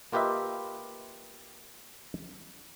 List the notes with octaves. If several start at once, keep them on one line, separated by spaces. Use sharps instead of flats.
A#3 F4 G4 B4 D#5 E5